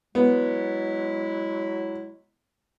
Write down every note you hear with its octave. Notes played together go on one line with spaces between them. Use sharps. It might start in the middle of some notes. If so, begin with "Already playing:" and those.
F#3 G#3 B3 E4